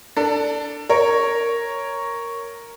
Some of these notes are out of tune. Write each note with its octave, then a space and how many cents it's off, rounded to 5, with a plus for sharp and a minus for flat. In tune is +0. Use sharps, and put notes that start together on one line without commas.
D4 +0 A4 +25
A#4 +0 C#5 +0